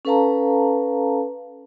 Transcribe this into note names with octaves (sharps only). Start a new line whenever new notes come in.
C#4 A4 B4 F5 A5 A#5